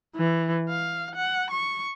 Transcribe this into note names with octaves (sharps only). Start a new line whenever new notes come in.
E3
F5
F#5
C#6